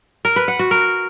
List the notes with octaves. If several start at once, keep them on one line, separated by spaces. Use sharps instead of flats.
A#4
B4
F#5
F#4
A#4